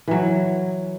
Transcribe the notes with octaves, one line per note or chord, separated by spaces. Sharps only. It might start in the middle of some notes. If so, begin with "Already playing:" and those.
E3 F#3